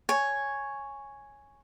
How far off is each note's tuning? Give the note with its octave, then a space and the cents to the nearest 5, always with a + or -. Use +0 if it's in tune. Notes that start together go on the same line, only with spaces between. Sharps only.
C#5 +0 G#5 +0